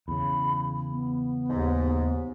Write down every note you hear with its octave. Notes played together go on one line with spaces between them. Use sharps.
E2 C#3 B5
B3
D#2 G#2